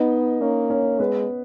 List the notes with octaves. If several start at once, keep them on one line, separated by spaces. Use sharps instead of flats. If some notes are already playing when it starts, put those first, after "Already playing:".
Already playing: B3 D#4 D#5
A#3 C#4 C#5
C#4 C#5
G#3 B3 B4